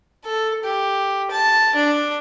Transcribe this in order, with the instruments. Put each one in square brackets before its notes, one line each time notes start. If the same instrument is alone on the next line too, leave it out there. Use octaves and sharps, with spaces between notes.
[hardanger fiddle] A4
G4
A5
D4